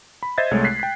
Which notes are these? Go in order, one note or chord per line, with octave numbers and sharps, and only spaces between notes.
B5
C5 D#5 E5 G#6 A6
C2 G#3 A3 C#5
F#6 B6 C7
G5 C7